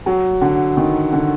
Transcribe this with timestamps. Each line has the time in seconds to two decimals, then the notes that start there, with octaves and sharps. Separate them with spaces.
0.06 F#3
0.41 D3
0.77 D#3
1.13 D3